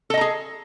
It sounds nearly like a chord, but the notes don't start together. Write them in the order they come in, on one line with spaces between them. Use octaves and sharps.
A4 D#5 A#5 G#4